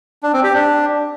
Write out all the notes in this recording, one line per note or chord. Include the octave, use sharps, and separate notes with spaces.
D4
C4
G4
D4